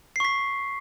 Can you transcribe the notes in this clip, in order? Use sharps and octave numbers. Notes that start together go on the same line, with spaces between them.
C#6 B6 C7